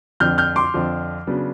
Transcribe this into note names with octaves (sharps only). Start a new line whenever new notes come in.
F2 D3 F3 F6 G6
F6 G6
C6 D6
F2 D3 F3
C#3 F#3 B3 D4